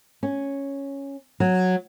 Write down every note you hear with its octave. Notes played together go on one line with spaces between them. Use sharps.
C#4
F#3